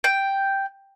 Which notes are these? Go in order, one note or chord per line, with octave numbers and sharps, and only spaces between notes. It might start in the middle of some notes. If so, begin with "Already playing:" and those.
G5